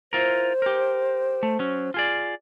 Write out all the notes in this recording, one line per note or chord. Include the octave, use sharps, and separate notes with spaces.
E4 F4 A#4 C5
G4 A#4
A3
F#3 C#4
F4 G#4 D5